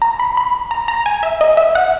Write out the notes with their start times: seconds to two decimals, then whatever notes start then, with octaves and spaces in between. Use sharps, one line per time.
0.02 A#5
0.20 B5
0.37 B5
0.71 A#5
0.88 A#5
1.06 G#5
1.23 E5
1.41 D#5
1.57 E5
1.75 F#5